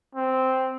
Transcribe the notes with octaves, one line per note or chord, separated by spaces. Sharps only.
C4